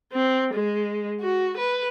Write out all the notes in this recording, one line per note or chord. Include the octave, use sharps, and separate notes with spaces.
C4
G#3
F#4
B4